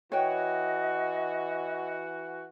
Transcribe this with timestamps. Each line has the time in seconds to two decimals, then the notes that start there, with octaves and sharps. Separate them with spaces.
0.12 E3 F#4 C#5 D#5 G5